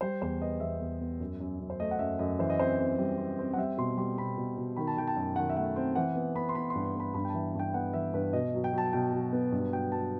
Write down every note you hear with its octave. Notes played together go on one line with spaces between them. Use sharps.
G3 C5
E2 C5
B3 D#5
E2 E5
E2
B3
F#2
F#2
F#2
C5
A3 D#5
F#5
F#2 E5
F#2 D#5
E3 C5
D#5
C4 C5
C4
G3
C4
C4
F#5
G3 E5
B2 C6
G3 C6
B2 B5
B2
B2
D#3 B5
A5
D#3 G5
A5
F#2
D#3 F#5
E5
A3 F#5
C4
E3 F#5
B3
B3 B5
C6
B3 B5
C6
G2
C6
B3 B5
G2 B5
G5
E3 A5
G2 G5
B3 F#5
E3 E5
G2 B4
B2 D#5
F#3
G5
F#3 A5
B2 G5
F#3
B3
G2
F#3 G5
F#3 A5